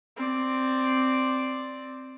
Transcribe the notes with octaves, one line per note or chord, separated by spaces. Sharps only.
C4 D5